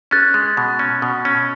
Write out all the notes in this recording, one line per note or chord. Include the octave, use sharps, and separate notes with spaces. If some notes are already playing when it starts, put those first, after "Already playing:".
C#4 F#6 A6
G#3
B2
C#4
B2
C#4